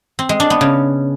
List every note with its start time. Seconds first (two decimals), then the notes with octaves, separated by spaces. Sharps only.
0.19 C4
0.29 G#3
0.40 D4
0.50 B3
0.61 C#3